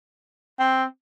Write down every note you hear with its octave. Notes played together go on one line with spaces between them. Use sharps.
C4